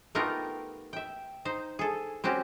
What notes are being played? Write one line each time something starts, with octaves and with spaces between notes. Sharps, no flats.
A3 B3 D#4 F4 G4 A#4
E5 G5
D#4 C5
G#4 A4
C4 C#4 F#4 G4